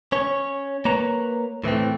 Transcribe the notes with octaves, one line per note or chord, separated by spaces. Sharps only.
C#4 C#5
A#3 B4 C#5 A#5
A2 E3 A3 C4